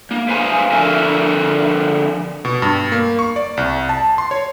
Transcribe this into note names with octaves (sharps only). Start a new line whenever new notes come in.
A#3
B4 C5 F5 G#5 A#5
D3 F3 A#4 E5
B2
G2
A#3
C#6
D5
C2
A5
C6
C#5